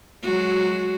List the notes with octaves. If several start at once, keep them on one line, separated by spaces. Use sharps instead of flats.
F#3 G#3 F#4